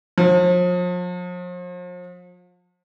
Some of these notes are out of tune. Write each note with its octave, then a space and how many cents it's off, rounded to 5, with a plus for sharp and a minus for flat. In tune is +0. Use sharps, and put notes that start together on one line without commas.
F3 +40